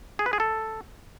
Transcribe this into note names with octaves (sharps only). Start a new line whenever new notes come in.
G#4
B4
G#4
A4